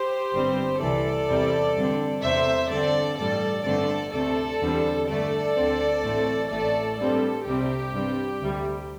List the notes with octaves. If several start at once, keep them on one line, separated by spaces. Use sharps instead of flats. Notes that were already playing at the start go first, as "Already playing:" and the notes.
Already playing: G4 C5
G1 G2 G3 C4
C2 C3 E3 A4 D5
E2 C3 G3 C4
G2 D3 C4
E2 C3 A3 C4 C5 E5
G2 D3 C4 A4 D5
A1 G2 G3 A4 D5
G1 G2 D3 A3 C4 A4 D5
D2 C3 A3 C4 A4 D5
E2 D3 G3 C4
G2 D3 A3 A4 D5
D2 D3 C4
A1 A2 A3 C4
A1 A2 A3 A4 D5
G2 G3 C4 A4
C2 C3 G3 C4 G4
G2 G3 C4
D2 C3 G3